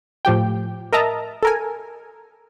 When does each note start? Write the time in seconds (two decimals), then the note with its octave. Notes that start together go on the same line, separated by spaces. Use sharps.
0.25 A2 F3 G4 G5
0.93 A#4 D#5 E5 A5 A#5
1.43 A4 A#4 G#5